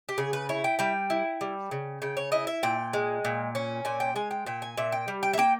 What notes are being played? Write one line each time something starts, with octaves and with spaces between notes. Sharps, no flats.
G4
C#3 G#4
B4
E4 C#5
G5
G3 G5
E4
G3
C#3
C#3 G5
C#5
E4 D#5
E5
A#2 G5
G#3
A#2
C#4
A#2 G#5
G5
G#3 G#5
G5
A#2 G5
G#5
A#2 E5
G5
G3
G5
E5
A#3 G5